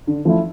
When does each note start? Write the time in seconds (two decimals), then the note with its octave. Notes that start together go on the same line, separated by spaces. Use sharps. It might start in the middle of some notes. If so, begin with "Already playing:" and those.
0.07 D3
0.25 F3 A3 E4